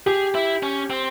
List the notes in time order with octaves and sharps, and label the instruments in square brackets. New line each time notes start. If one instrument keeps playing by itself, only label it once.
[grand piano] G4 [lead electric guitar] G#4
[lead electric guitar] E4
C#4
C4